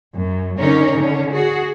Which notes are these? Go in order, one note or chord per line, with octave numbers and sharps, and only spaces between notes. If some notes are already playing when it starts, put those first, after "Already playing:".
F#2
D3 C#4 D#4 A#4 C#5
D3 C#4
F#4 G#4